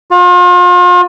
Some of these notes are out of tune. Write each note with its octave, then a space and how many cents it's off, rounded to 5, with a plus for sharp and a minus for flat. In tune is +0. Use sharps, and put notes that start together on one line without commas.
F4 +40